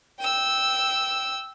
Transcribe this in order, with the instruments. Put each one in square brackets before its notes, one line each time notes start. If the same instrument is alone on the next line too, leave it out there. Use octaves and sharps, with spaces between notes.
[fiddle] G5 E6